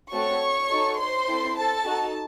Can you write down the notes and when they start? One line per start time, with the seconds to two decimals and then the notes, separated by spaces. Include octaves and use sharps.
0.12 A3 C4 F#4 A4 C#5 C#6
0.69 D#4 F#4 A4
0.98 C5 C6
1.28 C4 E4 A4
1.57 A4 A5
1.86 D#4 F#4 A4